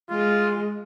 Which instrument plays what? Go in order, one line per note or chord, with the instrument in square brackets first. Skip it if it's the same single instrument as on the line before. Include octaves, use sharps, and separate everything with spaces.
[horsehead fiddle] G#3 [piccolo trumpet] F4